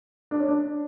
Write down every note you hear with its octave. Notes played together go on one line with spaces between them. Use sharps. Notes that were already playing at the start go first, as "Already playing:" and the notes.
D4
C#4
D4